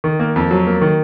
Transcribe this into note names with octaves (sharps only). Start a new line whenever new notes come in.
D#3
A#3
F2
F#3
A#3
D#3